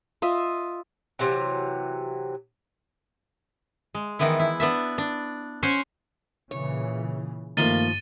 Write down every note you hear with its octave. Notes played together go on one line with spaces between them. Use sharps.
F4 D#5 E5
C3 E3 F#3
G#3
D#3 E3 B3 E4
E4
B3 D4 E5
D4
C#4 C5 C#5 F#5 G#5
A#2 C#3 E3 C#5
G2 D#3 F3 A3 A#3 A6 D#7 G7